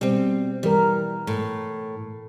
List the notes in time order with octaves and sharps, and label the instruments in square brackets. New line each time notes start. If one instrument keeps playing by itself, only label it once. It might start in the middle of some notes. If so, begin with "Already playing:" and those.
[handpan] B2 [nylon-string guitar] G3 C4
[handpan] E3 A#4 [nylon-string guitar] G3
[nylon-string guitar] A2